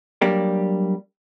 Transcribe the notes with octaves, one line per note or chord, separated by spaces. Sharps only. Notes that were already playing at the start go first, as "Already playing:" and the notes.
F#3 G3 A#3 D4 G4 A#4